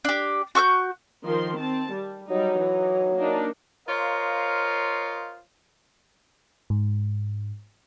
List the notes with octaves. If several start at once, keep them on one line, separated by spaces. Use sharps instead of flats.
D4 G4
F#4 C#6 E6 G6
D#3 F3 C6
C4 A5
G3
F#3 G3 D#4
E3 D#4
A#3 D4 D#4
F4 A#4 C5 C#5 D#5 F5
G#2